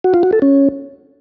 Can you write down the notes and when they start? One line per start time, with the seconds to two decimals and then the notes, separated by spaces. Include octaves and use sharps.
0.04 F#4
0.14 F4
0.23 F#4
0.33 A4
0.42 C#4